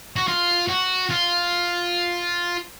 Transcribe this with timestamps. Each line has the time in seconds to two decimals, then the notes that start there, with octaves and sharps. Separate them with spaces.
0.16 F#4
0.28 F4
0.69 F#4
1.10 F4